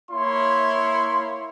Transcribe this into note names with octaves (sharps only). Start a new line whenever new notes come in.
A#3 E4 C#5 C6